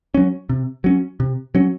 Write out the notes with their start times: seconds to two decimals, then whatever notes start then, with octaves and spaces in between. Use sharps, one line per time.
0.14 F#3 C#4
0.49 C3
0.84 F#3 C#4
1.20 C3
1.55 F#3 C#4